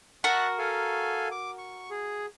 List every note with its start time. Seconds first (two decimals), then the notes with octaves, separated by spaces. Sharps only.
0.24 F#4 A#4 E5 A5 F#6
0.59 A4 F5 G#5
1.31 D6
1.58 C#6
1.90 G#4